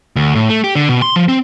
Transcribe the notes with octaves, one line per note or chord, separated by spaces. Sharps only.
D2
A2
A3
G4
D3
B2
C6
F3
C4